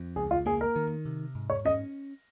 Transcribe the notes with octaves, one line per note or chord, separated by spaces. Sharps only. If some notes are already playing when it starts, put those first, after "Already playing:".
Already playing: F2
C#2 G#4
F4
A#3 G#4
A#4
D#3
C3
G#2
C#5
C#4 D#5